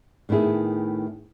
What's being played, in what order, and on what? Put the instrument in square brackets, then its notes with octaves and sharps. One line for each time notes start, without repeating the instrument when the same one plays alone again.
[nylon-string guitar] A2 D#3 B3 E4 G#4